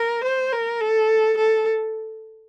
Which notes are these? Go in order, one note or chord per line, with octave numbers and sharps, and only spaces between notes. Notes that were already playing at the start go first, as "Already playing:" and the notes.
Already playing: A#4
C5
A#4
A4
A4